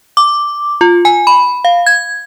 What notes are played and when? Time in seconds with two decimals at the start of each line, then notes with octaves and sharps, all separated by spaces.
0.17 D6
0.81 F4
1.05 G#5
1.27 B5
1.65 F5
1.86 G#6